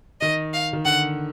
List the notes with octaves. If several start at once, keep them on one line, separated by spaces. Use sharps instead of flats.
D#3 D#5
F5
D#3
D3 F#5